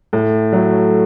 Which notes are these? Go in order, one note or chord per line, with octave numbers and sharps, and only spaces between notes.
A2
F#3 A3